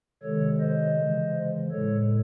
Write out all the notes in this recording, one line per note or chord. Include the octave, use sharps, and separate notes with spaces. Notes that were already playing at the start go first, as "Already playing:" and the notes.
C3 D#3 G#3 A4 C#5
C5 D#5
C#3 E3 G#3
A2 G#3 A4 C#5